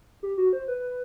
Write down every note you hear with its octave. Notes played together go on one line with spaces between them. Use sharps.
G4
F#4
C5
B4